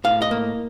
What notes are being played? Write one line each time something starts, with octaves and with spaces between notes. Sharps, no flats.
A2 F5
D#5
A#3